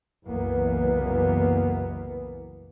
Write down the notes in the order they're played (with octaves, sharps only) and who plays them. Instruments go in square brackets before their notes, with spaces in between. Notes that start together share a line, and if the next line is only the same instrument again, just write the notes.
[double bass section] F#1 C2 E3 A#3 B3